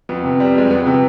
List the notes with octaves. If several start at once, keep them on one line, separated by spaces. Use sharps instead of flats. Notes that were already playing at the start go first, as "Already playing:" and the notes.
F2 B3
C3
G3
F2 G#3
F2 B3
C3